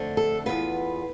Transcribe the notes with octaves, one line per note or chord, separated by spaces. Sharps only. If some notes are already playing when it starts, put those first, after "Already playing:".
Already playing: F2 D3 A3 D4
A4
E2 B2 B3 F4 B4